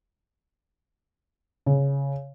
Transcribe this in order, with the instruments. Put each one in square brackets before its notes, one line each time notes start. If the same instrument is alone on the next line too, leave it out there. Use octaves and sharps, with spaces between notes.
[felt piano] C#3